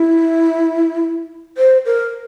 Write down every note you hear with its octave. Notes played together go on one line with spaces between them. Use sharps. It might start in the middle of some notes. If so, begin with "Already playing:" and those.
Already playing: E4
C5
A#4